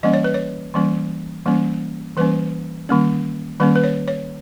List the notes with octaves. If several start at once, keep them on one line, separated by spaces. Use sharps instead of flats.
E3 G3 A#3 C#4 D#5
C#5
B4
C#5
E3 G3 A#3 C#4
E3 G3 A#3 C#4
E3 G3 A#3 C#4 B4
D#3 G3 A#3 C#4
D#3 G3 A#3 C#4 B4
B4
C#5
C#5